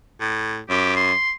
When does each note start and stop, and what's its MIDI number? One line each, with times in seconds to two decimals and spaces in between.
0.21 0.60 45
0.70 1.12 42
0.70 0.92 67
0.96 1.33 84